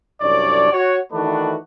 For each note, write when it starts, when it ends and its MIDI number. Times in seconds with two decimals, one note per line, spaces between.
0.22 0.70 36
0.22 0.70 42
0.22 0.70 62
0.22 0.70 73
0.22 0.70 74
0.72 0.97 66
0.72 0.97 73
1.12 1.55 51
1.12 1.55 52
1.12 1.55 57
1.12 1.55 62
1.12 1.55 66
1.12 1.55 71